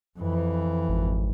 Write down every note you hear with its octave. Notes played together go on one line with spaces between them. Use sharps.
F2 E3
G#1